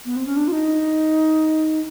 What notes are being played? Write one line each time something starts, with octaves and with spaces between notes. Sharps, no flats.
B3
C4
C#4
D4
F4
D#4